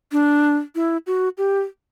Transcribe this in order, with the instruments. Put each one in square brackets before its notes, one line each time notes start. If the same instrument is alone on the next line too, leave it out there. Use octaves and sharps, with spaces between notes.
[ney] D4
E4
F#4
G4